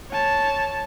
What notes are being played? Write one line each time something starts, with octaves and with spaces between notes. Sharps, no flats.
C#5 A5